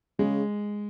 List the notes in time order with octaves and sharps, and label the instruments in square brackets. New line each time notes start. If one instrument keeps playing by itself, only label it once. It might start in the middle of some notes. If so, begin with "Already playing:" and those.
[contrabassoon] C#3 [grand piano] G#3